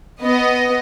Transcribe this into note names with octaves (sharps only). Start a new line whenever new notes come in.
B3 D#5